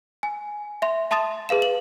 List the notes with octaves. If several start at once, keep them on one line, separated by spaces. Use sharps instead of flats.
G#5
E5 C6
E5 A5 C6 D#6 A6 E7
G#4 B4 F5 E7
F#7